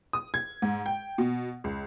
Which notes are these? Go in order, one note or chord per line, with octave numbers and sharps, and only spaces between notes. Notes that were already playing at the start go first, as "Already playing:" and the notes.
D#6
G#6
G#2
G5
B2
C#2